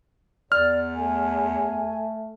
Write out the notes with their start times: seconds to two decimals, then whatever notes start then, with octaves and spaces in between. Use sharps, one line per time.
0.52 E2 D5 F6
0.96 A3 G#5